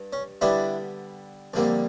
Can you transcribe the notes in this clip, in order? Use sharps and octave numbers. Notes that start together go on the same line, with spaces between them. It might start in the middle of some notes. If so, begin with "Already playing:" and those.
Already playing: G2
C#4
D3 G3 B3 D4 E4
F2 D3 G3 A#3